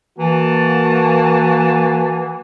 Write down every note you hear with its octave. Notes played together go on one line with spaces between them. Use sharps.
E3 A#3 F#4 A5